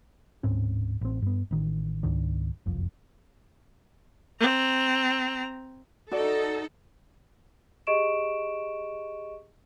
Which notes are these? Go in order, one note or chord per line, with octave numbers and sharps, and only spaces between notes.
D1 G#2 C4 C#4
A1 C4
G2 B3
A1 D#3
C#2 G#2 D#3 D4
F#1 C2 F2
C4 A#5
D#4 F#4 A4 D5
G4 G#4 D#5 C#6 D7 E7